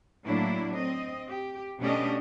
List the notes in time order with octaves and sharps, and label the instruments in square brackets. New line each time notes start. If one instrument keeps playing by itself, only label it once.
[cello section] A2 F#3 A3 A#3 D4 E4
C4 D#5
G4
B2 A3 C#4 D4 G4 D#5